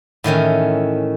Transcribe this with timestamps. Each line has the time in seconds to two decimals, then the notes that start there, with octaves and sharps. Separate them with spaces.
0.24 A2 D#3 E3 C#4